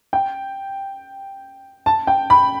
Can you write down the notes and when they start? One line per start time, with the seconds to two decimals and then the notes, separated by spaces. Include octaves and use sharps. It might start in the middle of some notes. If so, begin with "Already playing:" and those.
0.13 G5
1.86 A5
2.07 G5
2.30 B5